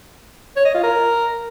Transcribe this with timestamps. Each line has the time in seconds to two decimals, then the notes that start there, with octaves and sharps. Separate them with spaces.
0.56 C#5
0.65 D#5
0.74 F4
0.83 A#4